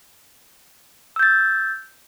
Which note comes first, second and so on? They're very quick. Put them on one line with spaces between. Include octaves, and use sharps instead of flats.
E6 G6 A6